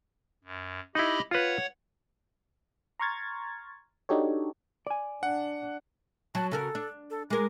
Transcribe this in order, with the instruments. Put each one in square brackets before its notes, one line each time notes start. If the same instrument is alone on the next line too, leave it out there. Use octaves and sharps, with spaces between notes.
[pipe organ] F#2
[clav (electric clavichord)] D#4 E4 [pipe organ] G4 D#5 B5
[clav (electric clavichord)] F4 B4 [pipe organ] C#5 F#5
[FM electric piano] A#5 C6 C#6 F6 G#6 A6
D4 D#4 F#4 G4 A4 C#5
[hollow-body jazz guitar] D5 G#5
[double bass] D4 [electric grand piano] F#5
[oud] F#3 [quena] A5
[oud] C#3 F#4 A#4 [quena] A4
[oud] D4
[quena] A4
[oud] G#3 A#4 [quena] D6